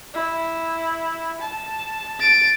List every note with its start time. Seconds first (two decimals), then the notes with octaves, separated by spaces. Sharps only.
0.14 E4
1.41 A5
2.20 A6 D7